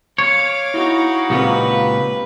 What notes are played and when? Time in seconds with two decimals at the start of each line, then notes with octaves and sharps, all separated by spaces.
0.18 C#5 F5 D6
0.74 D#4 E4 F#4
1.30 C#2 A#2 C4 G4 B4